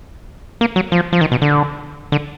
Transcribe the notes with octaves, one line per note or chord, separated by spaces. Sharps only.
A#3
F#3
F3
F3
D#3
B2
D3
D3